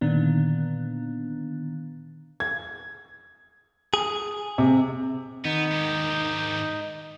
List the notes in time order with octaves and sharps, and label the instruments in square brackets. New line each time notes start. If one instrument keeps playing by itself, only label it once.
[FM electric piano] A#2 D3 D#3 B3 D4
[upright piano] G#6
[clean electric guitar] G#4
[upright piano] C3
[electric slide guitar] D#3 [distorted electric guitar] B3 [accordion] D#4 D#5 G6
[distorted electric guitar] G#2 G4